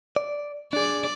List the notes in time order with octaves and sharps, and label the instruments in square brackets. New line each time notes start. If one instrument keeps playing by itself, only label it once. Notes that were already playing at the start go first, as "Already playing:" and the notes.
[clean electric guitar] D5
[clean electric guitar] D4 G#4 [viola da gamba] D5